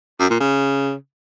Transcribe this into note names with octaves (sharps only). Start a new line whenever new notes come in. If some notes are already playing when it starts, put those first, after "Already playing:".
F#2
A#2
C#3